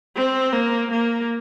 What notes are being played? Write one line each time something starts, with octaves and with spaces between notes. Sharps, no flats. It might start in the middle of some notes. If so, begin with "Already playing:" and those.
C4
A#3
A#3